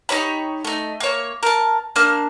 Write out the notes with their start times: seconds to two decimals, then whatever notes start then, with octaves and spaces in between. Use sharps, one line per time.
0.09 D#4 G4 C#5 B5
0.65 A3 D#4
1.00 A#3 C#5
1.43 A#4 A5
1.96 A#3 D4 F6